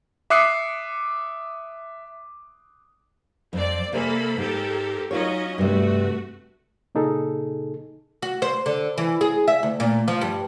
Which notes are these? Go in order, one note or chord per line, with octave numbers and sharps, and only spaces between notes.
E5 D6 D#6 F#6 C7 C#7
F2 C4 D5
C3 A#3 A4 C5 G#5 B5
G#2 G4 A4 A#4
F#3 C#4 D#4 F4 C#5 D#5
G2 C3 A3 F#4
A#2 C#3 D#4 G#4 A4
F#4
C5
D3
E3
G#4
E5
D2
A#2
F3
G2